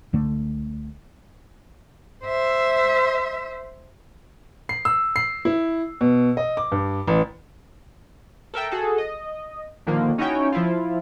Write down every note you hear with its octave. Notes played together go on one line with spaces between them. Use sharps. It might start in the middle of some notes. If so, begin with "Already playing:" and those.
C#2 D3 A3
C5 E5
C7
E6
C7
E4
B2
D#5
D6
G2
A1
A4 A#4 E5 G5
F#4 G#4 A4
D#5
A#2 D3 D#3 F3 A#3
C#4 D#4 E4 F#4 C#5 G5
F3 E4 F4